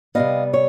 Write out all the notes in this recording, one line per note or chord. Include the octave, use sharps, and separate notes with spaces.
C3 D#3 G3 B3 D#5 F5
C#5